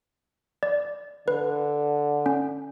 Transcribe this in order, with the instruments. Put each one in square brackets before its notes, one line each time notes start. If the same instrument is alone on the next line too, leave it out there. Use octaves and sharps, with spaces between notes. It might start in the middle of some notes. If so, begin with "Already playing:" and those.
[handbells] D5
[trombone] D3 [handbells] B4
[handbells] C#4